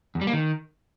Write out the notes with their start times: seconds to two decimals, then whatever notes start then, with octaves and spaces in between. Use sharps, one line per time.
0.15 E2
0.21 G3
0.27 A#3
0.33 D#3